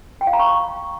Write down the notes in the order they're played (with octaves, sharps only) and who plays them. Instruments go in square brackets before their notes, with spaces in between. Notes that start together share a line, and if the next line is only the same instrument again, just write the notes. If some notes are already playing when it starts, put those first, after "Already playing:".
[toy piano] G5
F5
A#5
C#6